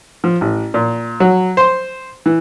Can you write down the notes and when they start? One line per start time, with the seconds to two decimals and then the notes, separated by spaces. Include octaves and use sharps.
0.24 F3
0.41 A1
0.74 A#2
1.20 F#3
1.57 C5
2.26 E3